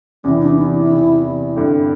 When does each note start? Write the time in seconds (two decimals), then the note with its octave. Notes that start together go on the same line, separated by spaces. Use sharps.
0.24 E2 C3 E3 C#4
0.41 D4
0.56 D#4
0.73 E4
0.90 E2 C3 E3
1.55 G2 D3 G3 C4